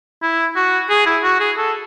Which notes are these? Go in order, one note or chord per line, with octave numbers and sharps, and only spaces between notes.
E4
F#4
G#4
E4
F#4
G#4
A4